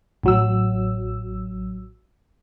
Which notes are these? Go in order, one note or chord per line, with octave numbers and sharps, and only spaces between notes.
A1 F#3 E6